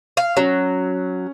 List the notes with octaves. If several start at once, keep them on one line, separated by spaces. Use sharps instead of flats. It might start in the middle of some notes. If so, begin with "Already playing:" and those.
F5
F#3 C#4